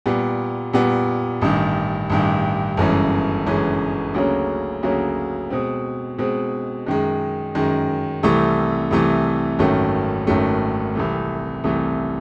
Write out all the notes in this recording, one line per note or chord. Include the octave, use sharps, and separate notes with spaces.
A#2 G3 B3
A#2 G3 B3
A1 G2 D#3
A1 G2 D#3
G1 F#2 C#3 E3 G#3
G1 F#2 C#3 E3 G#3
D2 C#3 F#3 A#3 C#4
D2 C#3 F#3 A#3 C#4
B2 G#3 C4
B2 G#3 C4
F#2 D#3 G#3
F#2 D#3 G#3
C2 C3 E3 A3
C2 C3 E3 A3
G#1 F#2 D#3 F#3 A3
G#1 F#2 D#3 F#3 A3
C2 C3 E3 A3
C2 C3 E3 A3